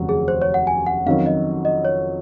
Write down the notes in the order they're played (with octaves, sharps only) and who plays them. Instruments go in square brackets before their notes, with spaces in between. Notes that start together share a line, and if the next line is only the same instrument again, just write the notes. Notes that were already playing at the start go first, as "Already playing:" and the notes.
Already playing: [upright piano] F1 D#2 C#3 F#3
[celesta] G#4
C5
C#5
F#5
G#5
F#5
[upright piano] F2 D#3 F#3 C#4 [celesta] F5
[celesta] D#5
D#5
C#5